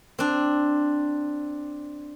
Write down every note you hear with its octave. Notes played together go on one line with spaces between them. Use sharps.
C4 D4